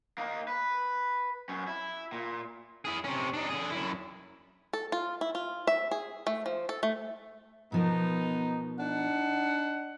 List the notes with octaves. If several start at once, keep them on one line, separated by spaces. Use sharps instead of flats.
A#3 D#4
B4
F#2 C#4
E4
A#2
E4 G#4
C3 C#4
D4 D#4
D3 G#4
F#2 E4
A4
F4
E4
F4
E5
G#4
A3
F3
A4
A3
B2 F3 B3 D#4 A#4
D4 D#4 F#5